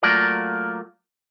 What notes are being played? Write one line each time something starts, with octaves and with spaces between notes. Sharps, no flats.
F#3 A3 A#3 F4 D5